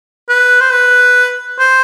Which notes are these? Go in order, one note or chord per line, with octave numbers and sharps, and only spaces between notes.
B4
C5
B4
C5